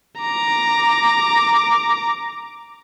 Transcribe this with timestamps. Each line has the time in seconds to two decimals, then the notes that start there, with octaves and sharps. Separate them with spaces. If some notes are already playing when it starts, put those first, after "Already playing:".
0.21 A#5 D6